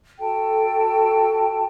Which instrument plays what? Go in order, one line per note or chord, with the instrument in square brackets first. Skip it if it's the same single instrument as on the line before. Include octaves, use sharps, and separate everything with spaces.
[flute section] F#4 A4 G5 A5